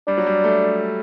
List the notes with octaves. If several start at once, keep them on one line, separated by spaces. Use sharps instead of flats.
G3 D4
F#3
G3
A3